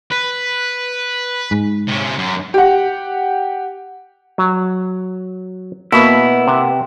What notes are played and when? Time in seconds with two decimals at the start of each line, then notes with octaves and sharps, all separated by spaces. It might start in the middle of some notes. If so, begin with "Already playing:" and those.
0.12 B4
1.51 G#2
1.88 C3 C#4
2.18 F#2
2.54 G4 F#5
4.38 F#3
5.92 B2 A#3 B3 E4 F#4 F5
6.47 C3 B4